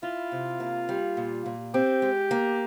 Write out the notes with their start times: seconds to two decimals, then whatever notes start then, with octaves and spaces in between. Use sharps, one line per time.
0.03 E4 F4
0.32 C3
0.60 A#3
0.89 G3
1.17 A#2
1.46 A#2
1.74 C4 G4
2.02 G#3
2.31 A#3